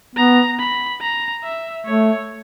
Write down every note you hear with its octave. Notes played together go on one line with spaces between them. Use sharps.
B3 A#5
B5
A#5
E5
A3 C#5